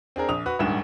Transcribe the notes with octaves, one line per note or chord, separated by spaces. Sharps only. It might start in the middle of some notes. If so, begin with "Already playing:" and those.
C4 D4 G#4 A#4
A#1 D#6 F7
F#4 B4
D#1 D2 G#2 E7